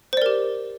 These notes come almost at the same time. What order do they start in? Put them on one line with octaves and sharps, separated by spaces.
C5 D5 A#4 G4